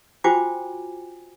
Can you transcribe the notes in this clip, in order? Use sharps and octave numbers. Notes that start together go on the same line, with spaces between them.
F4 F#4 C5 G5 G#5 D6